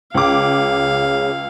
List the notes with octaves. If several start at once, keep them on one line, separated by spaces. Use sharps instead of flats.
C#2 C#3 F5 D6